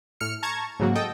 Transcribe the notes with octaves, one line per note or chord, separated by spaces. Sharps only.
A2 F6 C#7
A5 A#5 C#6 G#6
G#2 C#3 F#3 A#3 F#4
A4 D#5 G5